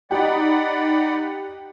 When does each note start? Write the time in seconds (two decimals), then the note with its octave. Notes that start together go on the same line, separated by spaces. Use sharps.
0.11 D#4 G4 D5 F#5 G5 B5